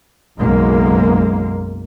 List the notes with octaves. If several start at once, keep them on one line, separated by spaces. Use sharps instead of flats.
F#1 B1 F#2 G#3 A#3